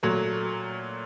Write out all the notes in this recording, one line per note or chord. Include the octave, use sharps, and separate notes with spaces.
A#2 F#3 A3